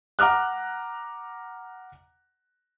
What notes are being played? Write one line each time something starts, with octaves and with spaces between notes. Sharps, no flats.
F#5 A#5 D6 F6 F#6